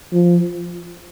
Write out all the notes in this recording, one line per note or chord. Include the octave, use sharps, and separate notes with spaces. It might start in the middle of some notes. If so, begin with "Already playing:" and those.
F3